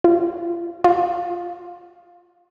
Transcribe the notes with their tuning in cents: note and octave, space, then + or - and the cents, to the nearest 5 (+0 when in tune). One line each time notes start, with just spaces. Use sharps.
F4 -35
F4 +5